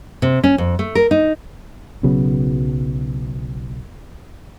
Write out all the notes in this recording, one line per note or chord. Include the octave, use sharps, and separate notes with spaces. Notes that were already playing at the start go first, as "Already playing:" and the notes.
C3
C#4
F2
A3
A#4
D#4
B1 C#3 F#3 B3